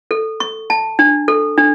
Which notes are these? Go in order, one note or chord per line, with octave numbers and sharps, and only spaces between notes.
A4
C#6
A5
D4
A4
D4